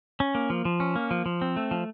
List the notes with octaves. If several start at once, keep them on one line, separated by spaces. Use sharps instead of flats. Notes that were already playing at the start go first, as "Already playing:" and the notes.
C#4
A#3
F3
F3
C#4
A#3
F3
F3
C4
A3
F3